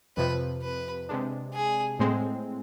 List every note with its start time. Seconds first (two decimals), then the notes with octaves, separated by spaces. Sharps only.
0.17 F2 C3 F3 B4
0.62 B4
1.09 C3 G#3 D4
1.54 G#4
1.99 A2 G#3 C4